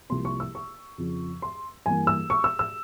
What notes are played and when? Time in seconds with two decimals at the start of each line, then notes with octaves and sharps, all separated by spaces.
0.10 C2 C3 F3 A#3 C6
0.25 C#6
0.40 E6
0.55 C#6
0.98 F2 C#3 F3
1.42 C6
1.86 G2 E3 A#3 G#5
2.07 E6
2.30 C#6
2.44 E6
2.59 E6